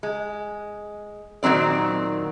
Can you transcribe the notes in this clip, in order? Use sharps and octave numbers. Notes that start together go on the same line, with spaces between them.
G#3
A#2 D#3 F#3 C4 D5